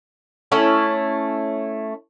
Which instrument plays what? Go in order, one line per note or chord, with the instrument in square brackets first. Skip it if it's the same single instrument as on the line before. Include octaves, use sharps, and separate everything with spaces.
[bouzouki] A3 C#4 E4